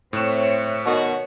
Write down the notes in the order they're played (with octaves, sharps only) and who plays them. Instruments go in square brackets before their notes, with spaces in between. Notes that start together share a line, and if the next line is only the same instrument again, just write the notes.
[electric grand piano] A2 F#6 E7 [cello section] C4 C#5 E5
[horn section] B2 D#3 F#4 [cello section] C#5 [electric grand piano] C#6